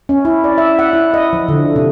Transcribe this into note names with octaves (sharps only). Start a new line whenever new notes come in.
C#4
E4
D5
E5
F#5
E4
D#5
F3
D3
C3